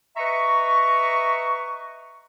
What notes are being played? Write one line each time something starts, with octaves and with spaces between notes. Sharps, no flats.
B4 D#5 E5 A#5 C#6